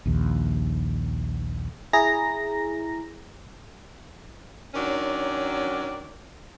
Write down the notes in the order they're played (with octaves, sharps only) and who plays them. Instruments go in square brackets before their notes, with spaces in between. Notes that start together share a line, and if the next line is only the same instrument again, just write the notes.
[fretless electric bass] A#1 D#2
[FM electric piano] E4 G#4 A#5 A#6
[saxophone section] D#3 F#3 C#4 D4